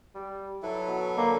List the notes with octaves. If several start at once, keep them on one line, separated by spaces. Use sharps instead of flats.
G3
F#3 E4 A4 B4
B2
D3 A#3